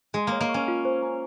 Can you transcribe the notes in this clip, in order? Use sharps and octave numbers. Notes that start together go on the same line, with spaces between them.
G#3 G#4
A#3 C#5
A#3
C#6
C#4
F4
C5
A#5